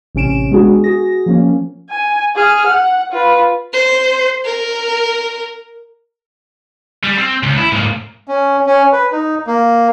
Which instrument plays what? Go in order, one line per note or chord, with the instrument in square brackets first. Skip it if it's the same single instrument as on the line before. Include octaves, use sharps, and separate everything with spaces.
[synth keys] A1 C3 C#4 D7 E7
G#3 B3 D4 F#4 G#4
F#4 G#4 A#6
F3 A#3 C#4
[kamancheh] G#5
G#4 F6
F#5
F4 B4
[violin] C5
A#4
[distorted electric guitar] G3
C4
C#2
E4
G#2 A#3
[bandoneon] C#4
C#4
B4
D#4
A#3